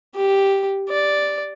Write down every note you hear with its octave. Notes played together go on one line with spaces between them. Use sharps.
G4
D5